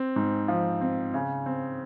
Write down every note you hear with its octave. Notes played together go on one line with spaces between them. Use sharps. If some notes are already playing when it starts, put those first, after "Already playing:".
Already playing: C4
G#2
F3
C4
C#3
C4